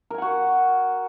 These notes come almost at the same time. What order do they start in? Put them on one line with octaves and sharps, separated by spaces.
A#4 G#5 F#5 F#4